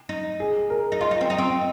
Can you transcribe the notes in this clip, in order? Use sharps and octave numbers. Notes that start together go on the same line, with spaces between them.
D#4
G#4
A#4
D#4
F4 D#5
D#4
C4
D#4
C4